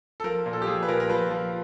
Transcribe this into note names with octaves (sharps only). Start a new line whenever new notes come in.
A4
F3 A#4
A#2
A4
G4
F3 G#4
B4
A#2 A#4
A#4
F3 B4
F3